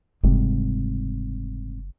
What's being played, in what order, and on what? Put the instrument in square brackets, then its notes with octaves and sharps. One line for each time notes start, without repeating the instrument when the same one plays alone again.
[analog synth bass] F#1 [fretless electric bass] G#2 C3 G3